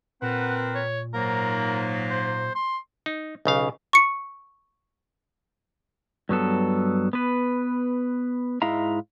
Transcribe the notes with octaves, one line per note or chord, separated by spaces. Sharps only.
A#2 C4 A#4 B4 F#5
C#5
G#2 F#3 A#3 A#4
C5
C6
D#4
B1 C#3 F5
C#6 C#7
G2 F#3 B3 A4
B3 B4
G#2 G#3 E4 E5 F5 A#5